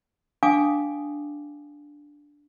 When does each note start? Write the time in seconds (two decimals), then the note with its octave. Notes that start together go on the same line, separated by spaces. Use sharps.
0.43 D4 F5 G5 G#5 D6 D#6